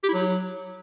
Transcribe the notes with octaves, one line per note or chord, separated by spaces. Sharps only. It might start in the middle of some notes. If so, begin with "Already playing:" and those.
G4
E4
F#3